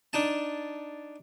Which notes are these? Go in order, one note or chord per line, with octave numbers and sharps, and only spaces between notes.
D4 D#4 A5